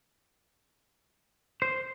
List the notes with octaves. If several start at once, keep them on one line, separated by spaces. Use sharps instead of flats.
C5